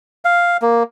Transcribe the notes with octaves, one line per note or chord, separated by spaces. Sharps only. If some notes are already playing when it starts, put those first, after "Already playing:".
F5
A#3